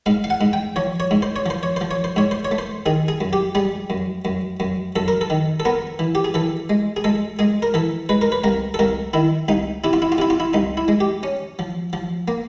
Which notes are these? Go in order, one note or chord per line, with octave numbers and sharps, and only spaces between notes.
G#2 F5
F5
F#5
G#2
G5
F3 C#5
C#5
G#2
C5
C#5
F3 C5
C#5
F3 C5
C#5
C5
G#2 C#5
C5
C#5
A3
C5
D#3 G#4
G#4
F#2
G4
G3 G#4
F#2
F#2
F#2
F#2 A4
A#4
A4
D#3
A4
B3 A#4
E3
G4
G#4
E3 A4
G#3
G#4
G#3 A4
G#3 G#4
A#4
E3 A4
G#3 B4
A#4
B4
C2 A#4
A4
C2 A#4
D#3 E4
C2 D#4
C3 E4
F4
E4
F4
C3 E4
F4
E4
C2 D#4
E4
G#3
G4
C#4
F3
F3
A#3